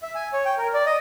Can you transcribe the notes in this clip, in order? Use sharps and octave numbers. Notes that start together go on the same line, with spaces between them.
E5
G#5
C#5
G5
A#4
D5
D#5